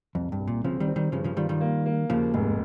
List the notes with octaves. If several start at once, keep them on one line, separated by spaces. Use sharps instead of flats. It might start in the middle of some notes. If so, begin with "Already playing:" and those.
C2 F2
G2
C2
A#2
C#3 F3 C4
D#3 G3
C4
D#3 G3
G2 C#3 F3
C#3 F3
D#3 G3 F4
D#3 G3
A#3
A#3
D#2 C#3 F3
F1 G#2